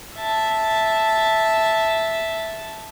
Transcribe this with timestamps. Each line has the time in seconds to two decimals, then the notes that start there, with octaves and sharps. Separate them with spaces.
0.16 E5 A5